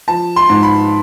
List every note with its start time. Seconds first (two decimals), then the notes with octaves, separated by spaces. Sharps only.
0.08 F3 A5
0.36 C6
0.49 G#2
0.63 B5